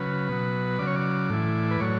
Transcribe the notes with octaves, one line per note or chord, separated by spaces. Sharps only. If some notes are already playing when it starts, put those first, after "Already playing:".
Already playing: C#3 F#3 B4
B2 F#3
C#3 F#3 D5
C#5
D5
A2 E3
B4
A2 F#3 C#5